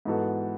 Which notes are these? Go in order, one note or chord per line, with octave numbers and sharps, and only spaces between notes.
G#2 E3 B3 F#4 A4